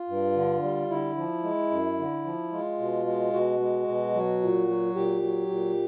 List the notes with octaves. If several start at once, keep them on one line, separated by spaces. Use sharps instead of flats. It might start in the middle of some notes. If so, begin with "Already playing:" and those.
Already playing: F4
G2
D3
G3
D3 E4
F3
G#3
F#2
D3
F3
G#3 F4
B2
G#3
B2 F#4
G#3
B2
F#3
A#2
F#3
A#2 G4
F#3
A#2